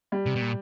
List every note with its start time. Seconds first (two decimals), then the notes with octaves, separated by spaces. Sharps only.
0.12 G3
0.26 C3
0.35 B2
0.41 A#2